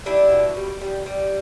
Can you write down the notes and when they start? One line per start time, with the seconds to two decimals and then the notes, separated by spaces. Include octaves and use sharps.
0.06 G3 D4 E4
0.32 B2
0.57 G3
0.81 G3
1.06 G3